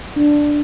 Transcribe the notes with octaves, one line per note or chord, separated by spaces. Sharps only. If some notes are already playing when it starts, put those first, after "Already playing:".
D4